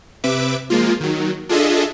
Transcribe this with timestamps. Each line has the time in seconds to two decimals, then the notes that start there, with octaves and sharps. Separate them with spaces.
0.24 C3 B4 E5 D6
0.70 F3 G#3 A#3 F4
1.01 D#3 F#3
1.49 D4 F4 G#4 A4 D#5 E5